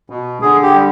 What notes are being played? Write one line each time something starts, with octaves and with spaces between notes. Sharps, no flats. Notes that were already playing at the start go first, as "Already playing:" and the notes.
B2
D3 G#4
G4
G3